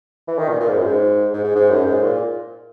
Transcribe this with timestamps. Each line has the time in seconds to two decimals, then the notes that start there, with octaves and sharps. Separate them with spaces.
0.28 E3
0.39 D#3
0.49 A#2
0.60 A#2
0.69 G#2
0.78 F#2
0.86 G#2
1.34 G#2
1.44 G#2
1.56 G#2
1.70 F#2
1.86 G#2
2.03 A#2